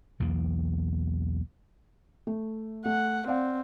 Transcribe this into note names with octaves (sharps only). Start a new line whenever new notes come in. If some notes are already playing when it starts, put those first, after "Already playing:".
B1 E2 E3 A#3
A3
A3 F#5
C4 D5 F5 F#5